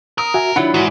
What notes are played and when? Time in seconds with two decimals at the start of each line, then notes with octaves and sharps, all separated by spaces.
0.18 A#4 D#6
0.34 F#4 E5 G#5
0.56 D#3 F#3 D4 E4 F4 F#5 B5
0.74 G#2 E3 F#4 D5